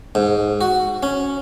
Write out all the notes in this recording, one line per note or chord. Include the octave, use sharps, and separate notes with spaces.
G#2
F#4
C#4